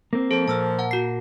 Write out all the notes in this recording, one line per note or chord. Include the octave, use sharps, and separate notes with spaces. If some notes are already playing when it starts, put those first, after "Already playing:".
A#3 C4
F3 A4
A#2 A#3 A5 E6 F6
F#5 A5
F#4 C7